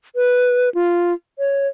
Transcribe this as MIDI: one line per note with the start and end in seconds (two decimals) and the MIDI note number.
0.16 0.69 71
0.75 1.13 65
1.39 1.67 73